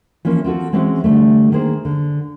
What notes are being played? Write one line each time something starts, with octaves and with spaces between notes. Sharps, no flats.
E3 F3 A#3 C#4
C4 F4 F#4 A4
E3 G#3 C4 C#4 F#4
D3 G3 A3
D#3 A#3 G#4 C5
D3